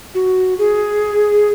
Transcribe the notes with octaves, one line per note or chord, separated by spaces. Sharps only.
F#4
G#4